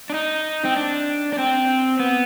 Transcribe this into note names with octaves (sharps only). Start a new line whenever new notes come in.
D4
D#4
C4
D4
D4
C4
B3